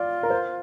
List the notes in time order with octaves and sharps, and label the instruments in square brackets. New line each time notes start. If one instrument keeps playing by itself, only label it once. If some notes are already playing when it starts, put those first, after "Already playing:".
Already playing: [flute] F4 [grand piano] D5
[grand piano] A#4
C5